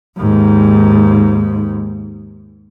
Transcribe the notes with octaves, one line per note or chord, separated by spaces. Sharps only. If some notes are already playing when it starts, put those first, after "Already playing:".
D#2 G#2